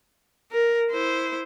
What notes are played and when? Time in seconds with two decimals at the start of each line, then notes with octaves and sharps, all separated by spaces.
0.52 A#4
0.92 E4 C5